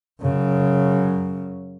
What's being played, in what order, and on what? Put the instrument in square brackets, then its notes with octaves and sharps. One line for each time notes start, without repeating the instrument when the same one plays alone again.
[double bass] F#2 C#3